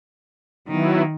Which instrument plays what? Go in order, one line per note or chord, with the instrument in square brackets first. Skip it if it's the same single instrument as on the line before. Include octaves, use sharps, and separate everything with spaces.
[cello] D#3 [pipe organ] F#3 B3 E4